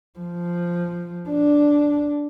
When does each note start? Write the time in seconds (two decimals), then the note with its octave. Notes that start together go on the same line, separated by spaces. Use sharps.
0.19 F3
1.29 D4